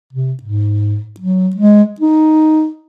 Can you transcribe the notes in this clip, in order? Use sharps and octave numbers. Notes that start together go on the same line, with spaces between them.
C3
G#2
F#3
G#3
D#4